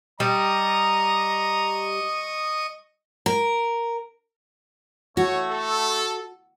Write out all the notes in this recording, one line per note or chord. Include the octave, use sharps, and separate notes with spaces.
G3 D#5 A#5 C#6 D#6
A#4
A3 F#4 C#5
A4